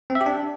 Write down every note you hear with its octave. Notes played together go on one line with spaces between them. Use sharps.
C4
E5
G4
D4